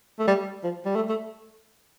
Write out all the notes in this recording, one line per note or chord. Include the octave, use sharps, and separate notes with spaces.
A3
G3
F3
G3
A3
A3